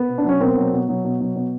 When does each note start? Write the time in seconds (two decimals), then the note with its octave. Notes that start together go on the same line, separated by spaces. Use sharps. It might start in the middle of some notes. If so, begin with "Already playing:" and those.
Already playing: B3
0.09 B2
0.18 D4
0.25 F#3 C#4
0.40 B2 A#3 C4
0.56 F#3
0.73 B2
0.89 F#3
1.04 B2
1.20 F#3
1.36 B2